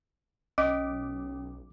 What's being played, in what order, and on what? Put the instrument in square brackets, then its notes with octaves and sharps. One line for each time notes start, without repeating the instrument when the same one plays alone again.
[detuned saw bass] B1 [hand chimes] C#4 [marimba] D#5 [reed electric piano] D6